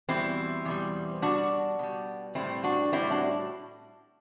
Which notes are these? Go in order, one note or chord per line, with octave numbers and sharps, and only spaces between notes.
E2 B2 G3 C4 E4
E2 B2 G3
B2 G3 D4 F#4
B2 G3
A2 G3 C4 E4
D4 F#4
A2 G3 C4 E4
D4 F#4